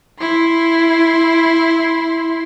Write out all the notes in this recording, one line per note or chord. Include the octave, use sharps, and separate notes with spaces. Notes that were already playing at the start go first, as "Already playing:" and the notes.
E4 C6